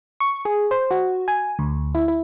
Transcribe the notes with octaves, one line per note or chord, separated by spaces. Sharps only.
C#6
G#4
C5
F#4
G#5
D2
E4
E4